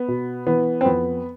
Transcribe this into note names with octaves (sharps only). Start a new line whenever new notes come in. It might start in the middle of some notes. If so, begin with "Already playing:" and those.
Already playing: B3
B2
E3 B3
C4
F2 B3